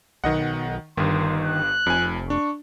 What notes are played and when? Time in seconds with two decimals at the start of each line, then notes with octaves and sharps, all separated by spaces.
0.24 B1 D#3 D#5 F#5
0.97 G1 G2 D#3 C6
1.44 F#6
1.86 F1 F2 G#5
2.30 D4 C#6